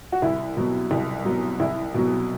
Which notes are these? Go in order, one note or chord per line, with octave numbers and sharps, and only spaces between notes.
F#4
C2 E4
B2 F#3
C2
B2 F#3
C2 E4
B2 F#3